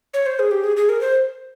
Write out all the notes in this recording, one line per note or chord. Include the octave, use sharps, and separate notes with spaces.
C#5
C5
G#4
G4
G#4
G#4
A#4
C5